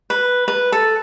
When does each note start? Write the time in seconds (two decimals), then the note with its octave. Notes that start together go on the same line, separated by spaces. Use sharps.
0.10 B4
0.48 B4
0.72 A4